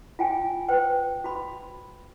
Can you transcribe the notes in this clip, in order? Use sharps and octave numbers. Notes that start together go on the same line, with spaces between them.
F4 G5 G#5
B4 C5 G5
F#4 B5